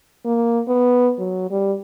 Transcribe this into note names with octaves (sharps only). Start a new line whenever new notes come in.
A#3
B3
F#3
G3